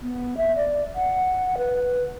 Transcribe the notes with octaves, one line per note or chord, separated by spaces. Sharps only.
B3
E5
D5
F#5
B4